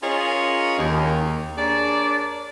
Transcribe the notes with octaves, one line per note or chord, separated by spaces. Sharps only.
C#4 F4 G#4 A#4 C#5 D#5
D#2
D4 G#4 A#4 C#5 D5